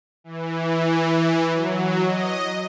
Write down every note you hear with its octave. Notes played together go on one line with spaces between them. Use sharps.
E3
F#3
D#5